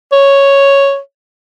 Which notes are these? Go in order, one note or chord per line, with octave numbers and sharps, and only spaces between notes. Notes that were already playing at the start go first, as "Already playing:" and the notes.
C#5